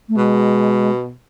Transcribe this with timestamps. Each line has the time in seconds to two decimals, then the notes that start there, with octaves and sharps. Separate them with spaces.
0.09 A3
0.16 B2 G#3